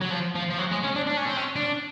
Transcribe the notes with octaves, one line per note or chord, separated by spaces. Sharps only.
F#3
F3
F3
F3
F#3
G#3
C#4
D4
D4
C#4
C4
C#4
D4